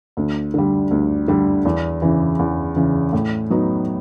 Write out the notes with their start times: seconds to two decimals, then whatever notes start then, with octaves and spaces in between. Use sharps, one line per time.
0.17 D2
0.54 D3 G3
0.91 D2
1.28 D3 G3
1.65 E2
2.02 C#3 E3
2.39 E2
2.76 C#3 E3
3.13 A2
3.50 F#3 B3 D#4